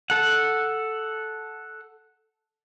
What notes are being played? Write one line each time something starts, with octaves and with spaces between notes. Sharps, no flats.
A4 F#5